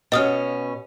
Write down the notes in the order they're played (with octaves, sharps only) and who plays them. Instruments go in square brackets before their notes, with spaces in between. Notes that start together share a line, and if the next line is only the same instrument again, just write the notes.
[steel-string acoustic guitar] B2 C#4 [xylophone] D#5 D#6 F6